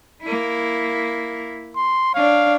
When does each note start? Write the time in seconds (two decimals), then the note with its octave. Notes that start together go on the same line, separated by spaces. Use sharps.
0.22 A#3 E4
1.76 C6
2.15 D4 C#5 F5